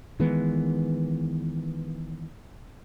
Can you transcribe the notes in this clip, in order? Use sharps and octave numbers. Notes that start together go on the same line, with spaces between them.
D#3 E3 G#3 B3